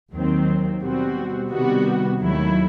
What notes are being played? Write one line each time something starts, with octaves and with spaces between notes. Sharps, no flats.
D#2 D#3 F#3 C4
B2 G3 C4 F#4
C3 D#3 G3 B3 F#4
D#2 D#3 F#3 A3 E4